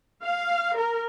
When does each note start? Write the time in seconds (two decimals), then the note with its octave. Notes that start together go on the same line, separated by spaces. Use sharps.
0.23 F5
0.76 A#4